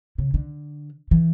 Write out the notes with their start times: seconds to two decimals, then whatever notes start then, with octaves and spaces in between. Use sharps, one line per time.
0.18 C#3
0.34 D3
1.11 E3